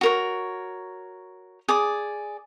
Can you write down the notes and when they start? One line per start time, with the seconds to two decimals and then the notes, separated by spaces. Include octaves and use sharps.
0.01 F#4 A#4 C#5
1.69 G#4 D5 D6